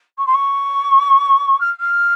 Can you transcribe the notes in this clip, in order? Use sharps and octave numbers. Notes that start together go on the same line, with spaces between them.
C#6
C6
C#6
F6
F6